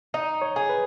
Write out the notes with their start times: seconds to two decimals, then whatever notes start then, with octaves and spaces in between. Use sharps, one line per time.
0.14 D#4 D#5
0.42 C#5
0.56 G#4
0.69 B4